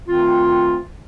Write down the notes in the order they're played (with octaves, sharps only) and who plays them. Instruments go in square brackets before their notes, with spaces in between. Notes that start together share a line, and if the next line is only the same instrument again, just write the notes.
[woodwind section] D2 D#3 C4 F4